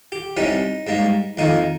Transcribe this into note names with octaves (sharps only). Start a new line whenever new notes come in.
G4
C2 C3 G3 C#4 D#4
G#2 G3 A#3
F2 D#3 A#3 D#4